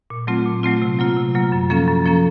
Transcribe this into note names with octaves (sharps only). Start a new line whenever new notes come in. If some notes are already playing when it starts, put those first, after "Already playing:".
A#2
F#3 A3 C4 F4
A#2
F#3 A3 C4 F4
C3
F#3 A#3 F4
C3
F#3 A#3 F4
F#2
F3 A#3 C#4 A4
F#2
F3 A#3 C#4 A4